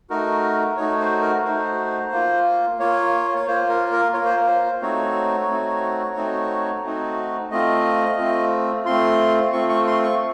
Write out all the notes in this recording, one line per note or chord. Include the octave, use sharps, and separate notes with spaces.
A3 D#4 F#4 A#4
A3 D#4 F#4 C#5
C5
A#4
A3 D#4 F#4 C5
A#3 F4
A#3 F4 C#5
C#5
A#3 F4 C5
A#4
A#4
F4 C#5
A#3
C5
A#4
C5
A3 C4 D#4 F#4 C#5
A3 C4 D#4 F#4
A3 C4 D#4 F#4
A3 C4 D#4 F#4
A3 C4 F4 D#5
A3 C4 F4
A3 C4 F4 C6
A3 C4 F4 C#6
C#6
C6
C#6